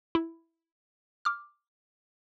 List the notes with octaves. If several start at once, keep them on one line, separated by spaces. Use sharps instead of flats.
E4
D6 F6